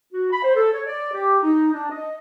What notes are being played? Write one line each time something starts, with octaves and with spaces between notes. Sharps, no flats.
F#4
B5
C5
A4
C#5
D5
G4
D#4
D4
D#5